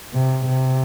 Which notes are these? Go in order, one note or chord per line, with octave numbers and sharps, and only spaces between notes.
C3
C3